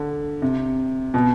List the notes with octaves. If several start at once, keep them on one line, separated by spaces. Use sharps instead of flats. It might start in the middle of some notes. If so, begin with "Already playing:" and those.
Already playing: D3
C3
B2